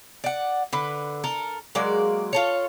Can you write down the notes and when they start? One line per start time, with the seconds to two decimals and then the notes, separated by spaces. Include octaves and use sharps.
0.24 D5 F#5
0.73 D3 B4
1.24 A4 A#4
1.75 F#3 G#3 A#3 D5
2.33 F4 A4 C#5